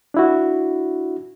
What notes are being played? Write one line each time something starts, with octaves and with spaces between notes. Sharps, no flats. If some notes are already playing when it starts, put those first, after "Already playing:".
D4 E4 F#4